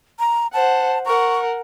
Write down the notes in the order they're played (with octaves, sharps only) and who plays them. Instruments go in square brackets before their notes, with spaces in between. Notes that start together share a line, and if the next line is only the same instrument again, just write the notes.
[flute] A#5
[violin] C5 F#5 [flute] A5
[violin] A#4 F#5 [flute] C#6